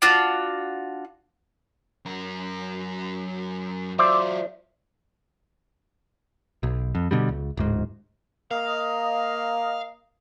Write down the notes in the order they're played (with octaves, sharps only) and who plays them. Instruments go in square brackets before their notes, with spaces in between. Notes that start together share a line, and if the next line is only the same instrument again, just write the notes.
[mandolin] D4 F4 F#4
[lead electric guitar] F#2 A#4
[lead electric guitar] F#3 F4 [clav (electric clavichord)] C5 D5 E5
[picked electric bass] B1
F2
B2 D3 G3
C#2
D1 G#2
[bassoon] A#3 [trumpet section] A#4 D#5 [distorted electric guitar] F5